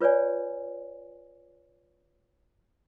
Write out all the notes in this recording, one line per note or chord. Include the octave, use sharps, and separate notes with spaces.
F4 B4 C#5 D5 G#5